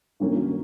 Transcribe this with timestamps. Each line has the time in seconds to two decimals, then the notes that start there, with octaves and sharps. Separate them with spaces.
0.20 G2 D#3 F#3 A#3 C#4